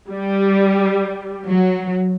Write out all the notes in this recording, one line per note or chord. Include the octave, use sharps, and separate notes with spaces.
G3
F#3